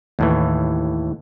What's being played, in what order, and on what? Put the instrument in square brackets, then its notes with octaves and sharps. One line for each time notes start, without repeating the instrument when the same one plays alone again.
[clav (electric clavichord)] D#2 A2 E3